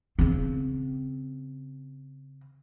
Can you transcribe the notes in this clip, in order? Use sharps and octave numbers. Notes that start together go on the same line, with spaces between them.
C#3 C4